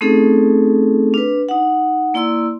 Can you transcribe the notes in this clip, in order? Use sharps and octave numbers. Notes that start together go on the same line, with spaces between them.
A3 C4 C#4 D#4 G#4 A4
D4 B4
D#4 F#5
A#3 E4 D5 C6 E6